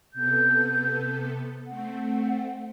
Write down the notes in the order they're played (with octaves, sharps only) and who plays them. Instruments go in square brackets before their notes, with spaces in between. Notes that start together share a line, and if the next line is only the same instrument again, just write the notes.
[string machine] C3 B3 A4 [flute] G6
[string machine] A3 C4 [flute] F#5